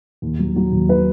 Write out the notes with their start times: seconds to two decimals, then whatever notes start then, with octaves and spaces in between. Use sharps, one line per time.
0.22 D#2
0.39 F#3
0.56 F#3
0.72 D#2
0.89 F#3 B4